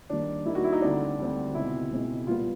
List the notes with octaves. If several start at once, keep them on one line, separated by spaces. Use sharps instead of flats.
D#2 D#3 G3 D4
D#2 D#3 G3 E4
F#4
E4
D#4
D2 D3 G3 C4 D4
D2 D3 G3 C4
C#2 B2 G#3 C4 E4
C#2 B2 G#3 C4
A#2 G3 B3 F4